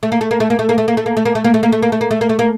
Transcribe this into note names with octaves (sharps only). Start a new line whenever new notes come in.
A3
A#3
A3
A#3
A3
A#3
A3
A#3
A3
A#3
A3
A#3
A3
A#3
A3
A#3
A3
A#3
A3
A#3
A3
A#3
A3
A#3
A3
A#3